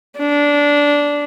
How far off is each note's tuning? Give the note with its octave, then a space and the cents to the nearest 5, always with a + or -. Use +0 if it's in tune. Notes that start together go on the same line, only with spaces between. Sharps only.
D4 -15